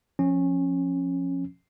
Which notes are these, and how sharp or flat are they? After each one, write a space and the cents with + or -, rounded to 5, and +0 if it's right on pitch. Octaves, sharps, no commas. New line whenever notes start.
F3 +10 C#4 -15